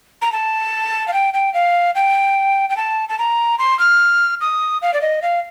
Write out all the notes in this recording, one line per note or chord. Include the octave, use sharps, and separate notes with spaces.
A#5
A5
F5
G5
G5
F5
G5
G5
A5
A5
A#5
C6
F6
D#6
F5
D5
D#5
F5